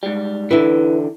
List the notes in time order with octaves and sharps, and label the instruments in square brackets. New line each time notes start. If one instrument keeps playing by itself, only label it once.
[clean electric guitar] G#2 G3
[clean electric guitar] D3 E3 [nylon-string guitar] E4 B4